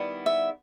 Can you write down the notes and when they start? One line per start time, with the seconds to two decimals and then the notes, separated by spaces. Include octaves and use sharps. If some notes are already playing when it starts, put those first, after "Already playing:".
Already playing: D#3 G3 B3 E4
0.26 E5